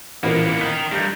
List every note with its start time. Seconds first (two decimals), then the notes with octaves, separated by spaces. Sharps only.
0.23 A1 A#2 A#3 B3 A#4
0.61 D#3 D#4 B6
0.92 G2 G4 G6